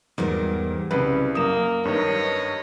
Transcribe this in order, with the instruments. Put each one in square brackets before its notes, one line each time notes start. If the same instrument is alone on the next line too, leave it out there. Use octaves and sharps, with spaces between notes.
[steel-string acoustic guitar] E2 G3 A#4 [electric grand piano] G#2
[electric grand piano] C2 B4 [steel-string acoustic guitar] C#3 G#3
[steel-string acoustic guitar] F#2 [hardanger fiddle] A#3 [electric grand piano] D#6 E7
[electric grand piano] G2 D#3 [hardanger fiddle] C#5 D#5